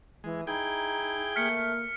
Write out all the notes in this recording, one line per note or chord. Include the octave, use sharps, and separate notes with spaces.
E3 G#3
D#4 E4 G#4 G5
A3 A#3 F6 B6 C#7